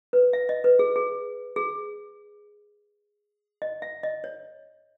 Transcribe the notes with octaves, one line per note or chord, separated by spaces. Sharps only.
B4
E5
D#5
B4
G#4
G#4
G#4
D#5
E5
D#5
C#5